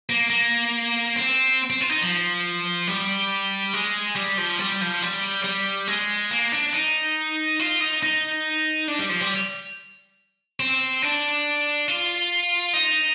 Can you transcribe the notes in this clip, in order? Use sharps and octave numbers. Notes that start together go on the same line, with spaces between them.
A#3
A#3
C4
C4
F4
D#4
F3
G3
G#3
G3
F3
G3
F3
G3
G3
G#3
A#3
D4
D#4
F4
D#4
D#4
D4
G3
F3
G3
C4
D4
F4
D#4